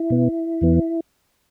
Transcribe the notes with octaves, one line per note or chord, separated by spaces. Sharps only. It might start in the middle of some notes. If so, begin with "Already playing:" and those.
Already playing: E4
B2 B3
E2 E3 B3